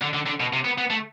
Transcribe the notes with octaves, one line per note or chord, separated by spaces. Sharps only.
D3
D3
D3
B2
C3
B3
B3
A3